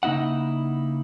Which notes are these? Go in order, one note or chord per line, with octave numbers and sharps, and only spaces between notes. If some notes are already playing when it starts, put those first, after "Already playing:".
C#3 A#3 D#4 E4 F#5